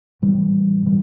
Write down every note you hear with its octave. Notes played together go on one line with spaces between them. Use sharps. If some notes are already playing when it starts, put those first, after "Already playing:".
A2 E3 G3
A2 E3 G3